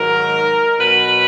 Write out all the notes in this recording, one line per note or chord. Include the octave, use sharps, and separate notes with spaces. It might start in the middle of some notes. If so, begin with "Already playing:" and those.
Already playing: G#2 D#3 F#3 A#4
B2 F#3 B4